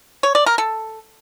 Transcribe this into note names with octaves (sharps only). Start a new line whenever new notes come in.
C#5
D5
A#4
A4